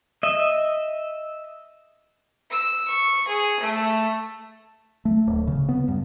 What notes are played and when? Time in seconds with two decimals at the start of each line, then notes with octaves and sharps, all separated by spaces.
0.23 D#5 E5
2.50 E6
2.88 C#6
3.28 G#4
3.60 A3
5.05 A3
5.27 D1
5.47 C#3
5.69 B3
5.88 G2